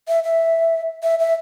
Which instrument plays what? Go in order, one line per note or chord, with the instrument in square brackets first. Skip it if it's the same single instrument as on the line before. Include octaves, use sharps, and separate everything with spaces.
[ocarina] E5
E5
E5
E5